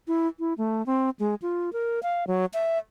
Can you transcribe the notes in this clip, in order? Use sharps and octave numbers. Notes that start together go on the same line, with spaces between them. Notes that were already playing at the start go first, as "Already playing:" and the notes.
E4
E4
A3
C4
G#3
F4
A#4
F5
F#3
E5